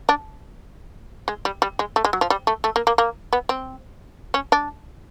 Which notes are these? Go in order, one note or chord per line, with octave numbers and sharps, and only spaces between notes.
D4
G#3
G3
G3
G#3
A3
G#3
F#3
F3
G3
A3
A3
A#3
A#3
A#3
B3
C4
C#4
D4